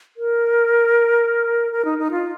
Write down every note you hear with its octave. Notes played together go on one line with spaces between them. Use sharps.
A#4
A#4
D#4
D#4
F4